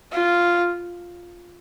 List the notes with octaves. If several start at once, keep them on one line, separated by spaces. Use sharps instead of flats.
F4